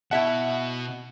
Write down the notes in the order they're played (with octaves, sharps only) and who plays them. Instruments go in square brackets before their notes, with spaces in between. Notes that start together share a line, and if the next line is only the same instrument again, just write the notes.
[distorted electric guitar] B2 [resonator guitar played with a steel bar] E4 E5 A5 [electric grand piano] F#5